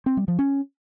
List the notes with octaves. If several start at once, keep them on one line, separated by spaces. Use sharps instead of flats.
C4
G3
F3
C#4